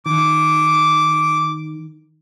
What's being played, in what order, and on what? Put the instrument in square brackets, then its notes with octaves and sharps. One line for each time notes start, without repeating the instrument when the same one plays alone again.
[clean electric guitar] D#3 [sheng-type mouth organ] D6